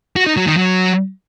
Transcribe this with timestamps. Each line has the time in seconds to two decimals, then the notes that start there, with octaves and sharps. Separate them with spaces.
0.16 F#4
0.27 D#4
0.37 F#3
0.47 D#3
0.57 F#3